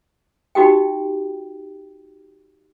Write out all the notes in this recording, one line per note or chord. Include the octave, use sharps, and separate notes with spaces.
D#4 F#4 G4 G5